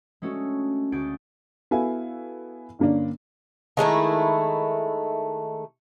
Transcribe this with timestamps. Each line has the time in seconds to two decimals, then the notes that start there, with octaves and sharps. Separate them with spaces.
0.22 G#3 A3 C#4 D4 F#4 A4
0.92 D2 F#4 G#4 G6 A6 D7
1.71 B3 E4 F#4 A4 F5 G#5
2.79 G2 D3 A#3 C#4 D4
3.77 D#3 G#3 A3 E4